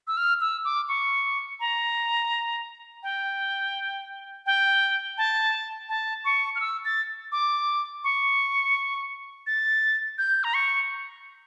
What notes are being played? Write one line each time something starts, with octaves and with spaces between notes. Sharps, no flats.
E6
F6
E6
D6
C#6
A#5
G5
G5
A5
A5
C#6
F6
E6
A6
D6
C#6
A6
G6
A#5
C#6